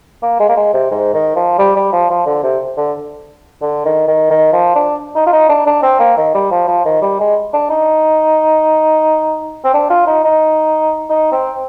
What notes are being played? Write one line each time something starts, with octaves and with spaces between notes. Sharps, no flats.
A#3
G#3
A#3
G#3
C3
G#2
D#3
F3
G3
G3
F3
F3
D3
C3
D3
D3
D#3
D#3
D#3
F3
D4
D#4
F4
D#4
D4
D4
C4
A#3
D#3
G3
F3
F3
D#3
G3
G#3
D4
D#4
C4
D4
F4
D#4
D#4
D#4
C4